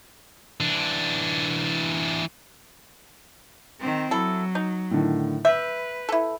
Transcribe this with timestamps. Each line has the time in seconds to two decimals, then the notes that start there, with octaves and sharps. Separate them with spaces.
0.60 E3 D4
3.80 D#3 C4
4.11 F#3 E4 A4
4.55 D#4
4.91 A2 D3 D#3
5.45 B4 E5 G6
6.09 E4 A4